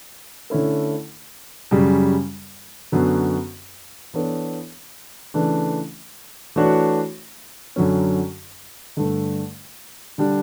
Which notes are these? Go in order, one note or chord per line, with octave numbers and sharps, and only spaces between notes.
D3 A3 C#4 E4 A4
F#2 C#3 G3
F#2 D3 F#3 B3
E3 B3 D4 A4 C#5
C#3 E3 A3 D4
E3 A3 D4 F#4 C#5
F#2 D3 F#3 C#4
G2 D3 A3
D3 G3 D4